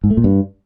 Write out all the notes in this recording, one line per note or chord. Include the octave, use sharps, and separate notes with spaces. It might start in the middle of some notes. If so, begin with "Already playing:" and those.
G#2
A3
A#2
G2